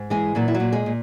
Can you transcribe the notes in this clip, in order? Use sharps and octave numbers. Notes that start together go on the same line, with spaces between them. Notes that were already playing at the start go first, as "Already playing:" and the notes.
Already playing: G#2
E3 G#3 G#4
A#2 F#3 F#4
E4
F#3 F#4
A#2
G#3 G#4
A#2